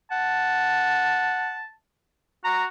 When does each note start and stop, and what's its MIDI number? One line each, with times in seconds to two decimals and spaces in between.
0.11 1.61 78
0.11 1.68 81
2.44 2.67 66
2.44 2.64 82